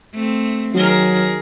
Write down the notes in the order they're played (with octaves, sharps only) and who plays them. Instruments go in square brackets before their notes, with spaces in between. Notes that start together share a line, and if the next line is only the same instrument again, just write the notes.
[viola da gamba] A3 C4
[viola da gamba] D#3 G#4 A#4 [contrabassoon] F#3